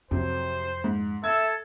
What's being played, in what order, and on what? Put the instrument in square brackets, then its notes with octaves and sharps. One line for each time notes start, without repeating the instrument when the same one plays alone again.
[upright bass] F2 [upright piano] C3 F#3 [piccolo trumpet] C5
[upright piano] G#2
[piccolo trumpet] A4 [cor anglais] E5 [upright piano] G#6